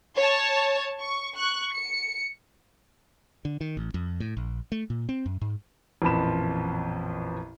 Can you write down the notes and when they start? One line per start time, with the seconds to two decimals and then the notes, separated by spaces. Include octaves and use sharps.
0.15 C#5 A5
1.00 C#6
1.36 C#6 F#6
1.73 C#7
3.45 D3
3.61 D#3
3.77 A1
3.94 F2
4.20 A2
4.37 A#1
4.72 A3
4.90 A#2
5.09 C4
5.26 F#2
5.41 G#2
6.02 A1 F2 A#2 F3 B5 E7